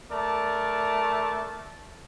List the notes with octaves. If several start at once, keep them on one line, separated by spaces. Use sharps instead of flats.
A3 A#4 D5 A5